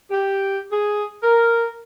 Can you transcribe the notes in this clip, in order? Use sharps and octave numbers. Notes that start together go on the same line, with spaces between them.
G4
G#4
A#4